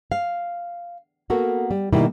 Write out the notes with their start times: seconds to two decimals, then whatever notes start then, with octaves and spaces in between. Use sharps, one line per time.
0.12 F5
1.30 A#3 B3 F#4 A4 A#4
1.71 G3
1.93 B2 D#3 G3 A#3 D#4 E4